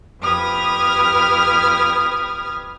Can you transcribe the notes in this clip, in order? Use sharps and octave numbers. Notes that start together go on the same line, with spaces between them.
F2 G4 B4 D#6 F6 G#6